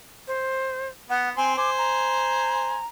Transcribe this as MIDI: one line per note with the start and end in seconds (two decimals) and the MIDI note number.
0.27 0.88 72
1.10 1.32 59
1.10 1.29 78
1.37 1.53 60
1.37 1.53 80
1.37 1.53 84
1.57 2.81 72
1.57 2.81 80
1.57 1.70 86
1.78 2.87 82